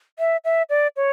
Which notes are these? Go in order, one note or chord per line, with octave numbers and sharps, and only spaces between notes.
E5
E5
D5
C#5